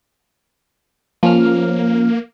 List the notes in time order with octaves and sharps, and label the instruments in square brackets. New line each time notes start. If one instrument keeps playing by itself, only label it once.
[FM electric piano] F3 C#4 F6 [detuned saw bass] A#3